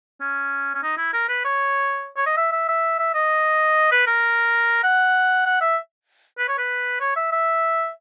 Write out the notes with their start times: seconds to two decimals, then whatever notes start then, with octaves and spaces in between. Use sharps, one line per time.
0.21 C#4
0.75 C#4
0.83 D#4
0.97 E4
1.14 A#4
1.29 B4
1.45 C#5
2.17 C#5
2.26 D#5
2.37 E5
2.52 E5
2.68 E5
2.99 E5
3.14 D#5
3.92 B4
4.07 A#4
4.84 F#5
5.46 F#5
5.61 E5
6.39 B4
6.48 C#5
6.58 B4
7.01 C#5
7.16 E5
7.32 E5